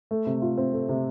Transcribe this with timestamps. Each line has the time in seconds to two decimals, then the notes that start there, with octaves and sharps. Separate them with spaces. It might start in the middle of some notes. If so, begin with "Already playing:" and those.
0.11 A3
0.26 C3
0.42 F4
0.58 C4
0.73 A3
0.89 C3